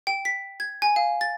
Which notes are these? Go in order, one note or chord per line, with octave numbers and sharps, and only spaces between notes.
G5
B6
G#6
G#5
F5
A6